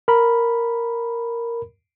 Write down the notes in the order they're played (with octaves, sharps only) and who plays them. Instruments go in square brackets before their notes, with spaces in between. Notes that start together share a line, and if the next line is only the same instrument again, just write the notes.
[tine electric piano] A#4 B5